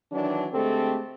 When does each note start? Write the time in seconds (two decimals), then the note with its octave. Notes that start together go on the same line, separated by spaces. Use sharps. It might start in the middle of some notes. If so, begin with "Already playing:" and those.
0.12 D#3 E3 F#3 D4
0.53 D3 G#3 A3 C4 G4 A4